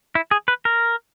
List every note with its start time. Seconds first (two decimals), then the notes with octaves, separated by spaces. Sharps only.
0.15 E4
0.31 G#4
0.48 B4
0.65 A#4